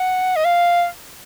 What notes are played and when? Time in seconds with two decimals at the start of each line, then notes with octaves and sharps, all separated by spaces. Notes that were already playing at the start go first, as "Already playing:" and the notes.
Already playing: F#5
0.36 D#5
0.45 F5